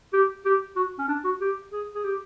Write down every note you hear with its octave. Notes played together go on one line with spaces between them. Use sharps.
G4
G4
F#4
C#4
D4
F#4
G4
G#4
G#4
G4